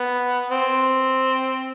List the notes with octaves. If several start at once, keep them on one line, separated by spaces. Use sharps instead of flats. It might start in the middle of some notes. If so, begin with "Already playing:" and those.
Already playing: B3
C4